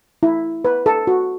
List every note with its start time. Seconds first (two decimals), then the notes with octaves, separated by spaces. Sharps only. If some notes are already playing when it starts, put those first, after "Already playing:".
0.23 E4
0.65 B4
0.86 A4
1.07 F#4